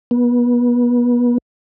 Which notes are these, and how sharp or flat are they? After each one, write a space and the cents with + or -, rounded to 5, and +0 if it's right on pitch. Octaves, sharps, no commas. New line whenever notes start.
B3 -30